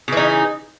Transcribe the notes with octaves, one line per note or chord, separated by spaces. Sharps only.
C#3 E3 D#4